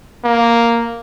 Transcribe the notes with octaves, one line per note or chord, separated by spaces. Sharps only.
A#3